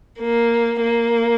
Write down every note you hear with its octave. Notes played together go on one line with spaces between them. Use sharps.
A#3
A#3